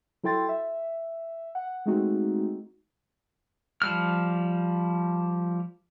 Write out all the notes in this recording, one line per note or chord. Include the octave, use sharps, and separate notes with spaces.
F#3 E4 A4 G5 C6 A6
E5
F#5
G#3 A3 C4 D#4 F#4
F3 G3 F6